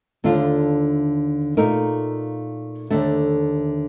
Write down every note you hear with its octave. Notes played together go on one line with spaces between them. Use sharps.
D#2 D3 A3 D4 F4
A#2 A3 D#4 A#4
D#2 D3 A3